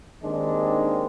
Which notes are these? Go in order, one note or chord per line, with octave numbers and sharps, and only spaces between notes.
D#2 D#3 G#3 C4 D4